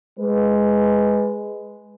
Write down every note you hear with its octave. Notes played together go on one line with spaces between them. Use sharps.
G#3 B4